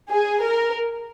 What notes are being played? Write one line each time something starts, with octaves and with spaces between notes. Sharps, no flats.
G#4
A#4